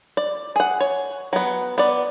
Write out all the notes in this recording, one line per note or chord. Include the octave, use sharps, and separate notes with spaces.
D5
G#4 F#5
C#5
F#3 B3
B3 D5